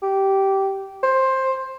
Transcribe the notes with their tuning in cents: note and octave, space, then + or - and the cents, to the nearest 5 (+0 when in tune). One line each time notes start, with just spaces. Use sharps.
G4 -15
C5 +15